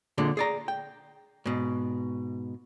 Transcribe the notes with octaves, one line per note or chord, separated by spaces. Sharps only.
A#2 D3 G#3
G#4 D5 A#5
G5
G#2 B2